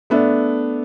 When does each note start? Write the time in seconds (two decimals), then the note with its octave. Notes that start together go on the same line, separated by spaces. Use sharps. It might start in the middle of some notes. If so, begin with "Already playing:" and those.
0.10 A3 B3 D4 E5